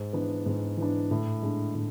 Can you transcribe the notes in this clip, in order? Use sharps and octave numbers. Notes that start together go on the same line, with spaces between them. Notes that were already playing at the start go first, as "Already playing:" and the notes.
Already playing: G#2
E3 B3 D4
G#2
E3 B3 D4
A2
G#3 D4
A2